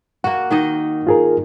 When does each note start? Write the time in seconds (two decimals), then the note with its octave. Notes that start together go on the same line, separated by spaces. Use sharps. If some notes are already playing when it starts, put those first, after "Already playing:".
0.24 A#3 F#4 F#5
0.51 D#3 D#4 D#5
1.07 F4 G#4 A#4